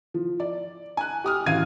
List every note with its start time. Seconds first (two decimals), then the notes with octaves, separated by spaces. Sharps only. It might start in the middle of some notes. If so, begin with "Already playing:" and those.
0.14 F3
0.40 D5
0.97 G#5 F#6
1.24 G4 D#6 F6
1.46 A1 E3 F#4 F5 G#6 D#7